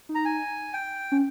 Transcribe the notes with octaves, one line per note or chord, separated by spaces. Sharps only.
D#4
A#5
G#5
G5
C#4